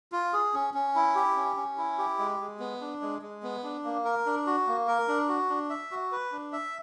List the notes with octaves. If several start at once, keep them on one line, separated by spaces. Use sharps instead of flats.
F4
G#4
C#4
C#4
E4
G4
C#4
C#4
E4
G4
G#3
G#3
B3
D4
G#3
G#3
B3
D4
A#3
A#4
D4
F#4
A#3
A#4
D4
F#4
D4
E5
F#4
B4
D4
E5